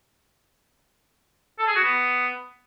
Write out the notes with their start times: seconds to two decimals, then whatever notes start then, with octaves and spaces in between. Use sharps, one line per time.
1.59 A4
1.67 G#4
1.76 F#4
1.84 B3